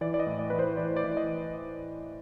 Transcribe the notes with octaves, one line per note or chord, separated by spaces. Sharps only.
E3 D5
D5
D#5
A2
D5
E3 B4
C5
E3 D5
D5
E3
D#5